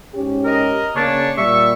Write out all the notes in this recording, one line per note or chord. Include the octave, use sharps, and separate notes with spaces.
G#2 C#4 G4
A#4 D#5
C#3 A#3 D4 C#5 A5
A#2 G3 E5 C#6